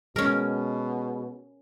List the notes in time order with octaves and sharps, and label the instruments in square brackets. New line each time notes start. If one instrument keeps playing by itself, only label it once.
[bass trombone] B2 [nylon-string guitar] G#3 [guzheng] C#4 A#4